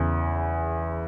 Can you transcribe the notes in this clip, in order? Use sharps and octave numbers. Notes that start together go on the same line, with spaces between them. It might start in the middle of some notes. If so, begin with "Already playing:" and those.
Already playing: E2 C#3 E3